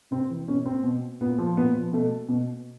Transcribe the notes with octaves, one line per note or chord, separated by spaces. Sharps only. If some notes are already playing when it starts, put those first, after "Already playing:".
C3 C4
E3
B2 C#4
C4
B2
A#2 B3
F3
A#2 B3
F3
B2 A3
B2